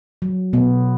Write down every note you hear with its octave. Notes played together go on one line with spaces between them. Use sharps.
F#3
B2 B3